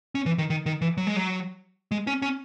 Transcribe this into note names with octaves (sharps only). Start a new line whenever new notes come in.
C#4
E3
D#3
D#3
D#3
E3
F#3
G#3
F#3
G#3
C#4
C#4